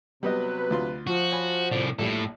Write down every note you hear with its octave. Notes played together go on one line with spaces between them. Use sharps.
C3 F#3 G3 B3 B4 D#5
D2 F4 C6
F3 F#4
C#5 G#5 B5
C2 A2 D5
A#1 A2 G3 A4